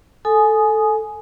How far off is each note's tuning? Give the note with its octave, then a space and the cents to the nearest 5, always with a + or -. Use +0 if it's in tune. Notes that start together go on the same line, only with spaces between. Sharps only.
A4 +0 G#5 +20 D#6 -5